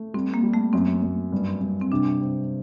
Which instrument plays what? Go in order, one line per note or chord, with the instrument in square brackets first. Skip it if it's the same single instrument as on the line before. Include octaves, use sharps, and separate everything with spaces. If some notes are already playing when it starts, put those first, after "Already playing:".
Already playing: [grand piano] A3
[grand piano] G3 [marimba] C4
[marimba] A#3
[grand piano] G3
[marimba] A3
[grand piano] F#2 [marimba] C4
[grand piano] F#2
G2
G2
[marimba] C4
[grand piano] C3 [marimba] D4
[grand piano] C4